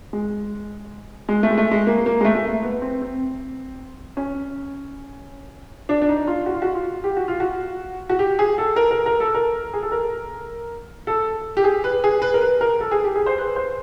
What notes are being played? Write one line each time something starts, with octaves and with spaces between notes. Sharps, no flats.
G#3
G#3
A3
G#3
A3
G#3
A#3
A#3
G#3
A3
A3
A#3
B3
C4
C4
C#4
D4
D4
D#4
F4
F#4
F4
F#4
F4
G4
F#4
F4
F#4
F#4
G4
G#4
A4
A#4
A#4
A#4
A4
A#4
G#4
A4
A#4
A4
G4
G#4
B4
G#4
B4
A#4
B4
A#4
A4
G#4
G4
G#4
C5
B4
C5